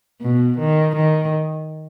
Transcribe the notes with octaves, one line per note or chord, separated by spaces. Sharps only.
B2
D#3
D#3